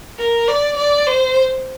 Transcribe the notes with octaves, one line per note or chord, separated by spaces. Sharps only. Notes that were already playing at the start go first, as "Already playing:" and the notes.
A#4
D5
D5
C5